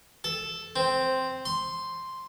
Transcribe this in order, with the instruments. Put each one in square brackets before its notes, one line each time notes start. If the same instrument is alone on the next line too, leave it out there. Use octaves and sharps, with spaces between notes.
[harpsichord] A4
C4
C6